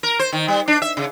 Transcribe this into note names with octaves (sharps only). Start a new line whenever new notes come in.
A#4
C5
D#3
G3
D4
E5
C#3